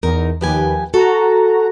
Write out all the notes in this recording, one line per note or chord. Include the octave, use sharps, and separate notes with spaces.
E2 D#4 A#4
D#2 F3 G4 B4 G#5
F#4 A4 A#5